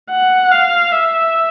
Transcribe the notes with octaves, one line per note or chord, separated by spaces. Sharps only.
F#5
F5
E5